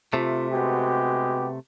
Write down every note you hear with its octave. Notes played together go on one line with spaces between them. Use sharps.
C3 A3 F4
G#3 B3 F#4 G4